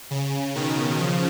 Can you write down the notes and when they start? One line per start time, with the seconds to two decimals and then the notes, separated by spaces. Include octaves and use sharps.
0.11 C#3
0.55 B2 D#3
0.99 C#3 F3